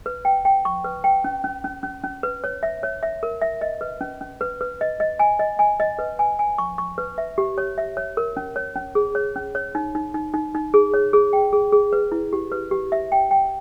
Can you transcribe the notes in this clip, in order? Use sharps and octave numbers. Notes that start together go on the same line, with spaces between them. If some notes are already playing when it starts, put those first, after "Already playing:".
B4
G5
G5
C#6
B4
G5
C#4
C#4
C#4
C#4
C#4
B4
C#5
E5
C#5
E5
A#4
E5
D#5
B4
C#4
C#4
B4
B4
D#5
D#5
G#5
D#5
G#5
D#5
B4
G#5
G#5
C#6
C#6
B4
E5
G4
C#5
E5
C#5
A#4
C#4
C#5
C#4
G#4
C#5
C#4
C#5
D#4
D#4
D#4
D#4
D#4
G#4
C#5
G#4
G5
G#4
G#4
B4
E4
G4
B4
G4
E5
G5
G5